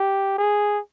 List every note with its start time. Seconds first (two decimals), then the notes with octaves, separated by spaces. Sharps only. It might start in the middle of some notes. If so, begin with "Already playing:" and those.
Already playing: G4
0.38 G#4